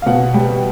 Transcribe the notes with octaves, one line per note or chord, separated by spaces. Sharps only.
F5
B2 F#5
G3 G5